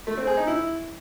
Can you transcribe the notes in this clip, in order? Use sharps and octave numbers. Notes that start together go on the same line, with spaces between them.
A3
C4
G#4
D#4
E4